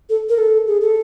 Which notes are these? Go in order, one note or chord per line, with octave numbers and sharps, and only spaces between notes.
A4
A#4
A4
G#4
A4